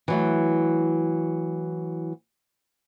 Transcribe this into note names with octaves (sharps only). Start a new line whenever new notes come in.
E3 F#3 A3